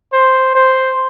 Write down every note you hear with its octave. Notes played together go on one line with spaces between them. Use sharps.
C5
C5